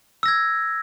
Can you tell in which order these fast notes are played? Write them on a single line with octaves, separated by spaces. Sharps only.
E6 A#6 G#6